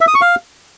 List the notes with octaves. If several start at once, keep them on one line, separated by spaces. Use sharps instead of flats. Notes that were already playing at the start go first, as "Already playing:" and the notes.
E5
D#6
C#6
F5